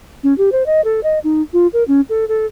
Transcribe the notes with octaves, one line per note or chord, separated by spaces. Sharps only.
C#4
G4
C5
D#5
A4
D#5
D#4
F4
A#4
C#4
A4
A4